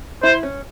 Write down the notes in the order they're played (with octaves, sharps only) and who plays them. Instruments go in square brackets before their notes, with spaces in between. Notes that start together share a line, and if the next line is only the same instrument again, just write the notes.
[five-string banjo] E4 [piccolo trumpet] C5
[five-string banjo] C#4